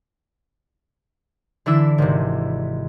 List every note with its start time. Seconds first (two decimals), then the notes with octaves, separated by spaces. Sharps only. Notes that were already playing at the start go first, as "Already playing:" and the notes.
1.66 D3 E3 D4 E4 E6 E7
1.98 G#1 C3